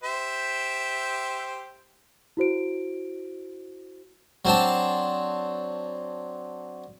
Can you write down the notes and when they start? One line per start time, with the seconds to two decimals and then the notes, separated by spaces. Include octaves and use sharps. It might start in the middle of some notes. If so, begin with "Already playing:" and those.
0.04 G4 C5 E5
2.37 E4 F#4 C5 D7
4.45 F#3 C4 D4 A5